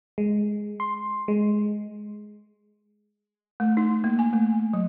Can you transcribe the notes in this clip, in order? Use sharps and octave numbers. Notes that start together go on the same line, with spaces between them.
G#3
C6
G#3
A3
D#4
A#3
G#5
A3
F#3